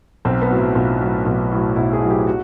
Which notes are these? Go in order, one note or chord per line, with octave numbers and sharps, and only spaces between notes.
B1 C4
B3
A2 F#3
E4
B1 F4
A2 F#3
B1
A2 F#3
B1 E4
G#4
A2 F#3
G4
F#4